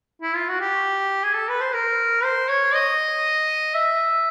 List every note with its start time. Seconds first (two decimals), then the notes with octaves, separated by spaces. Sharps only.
0.22 E4
0.35 F4
0.48 F#4
0.61 G4
1.23 G#4
1.35 A4
1.49 B4
1.61 C5
1.74 A#4
2.24 C5
2.49 C#5
2.74 D#5
3.74 E5